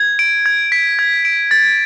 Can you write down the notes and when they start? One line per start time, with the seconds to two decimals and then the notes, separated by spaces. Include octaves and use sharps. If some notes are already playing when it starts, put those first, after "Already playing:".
Already playing: G#6
0.19 D7
0.46 G#6
0.72 B6
0.99 G#6
1.25 D7
1.51 A6